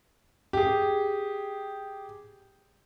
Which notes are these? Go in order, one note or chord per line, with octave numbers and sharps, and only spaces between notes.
G4 G#4